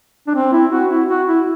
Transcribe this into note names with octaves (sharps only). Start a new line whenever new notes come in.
D4
C4
E4
F#4
E4
F#4
E4